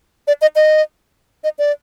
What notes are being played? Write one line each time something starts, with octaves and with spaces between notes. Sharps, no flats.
D5
D#5
D#5
D#5
D5